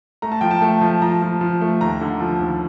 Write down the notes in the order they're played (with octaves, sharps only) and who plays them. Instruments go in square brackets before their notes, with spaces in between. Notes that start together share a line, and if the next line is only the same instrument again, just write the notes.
[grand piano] A3 A#5
A5
F3 G5
A5
A3
F3
F3 A#5
F3
F3
A3
D#2 A#5
D3
F3
D#2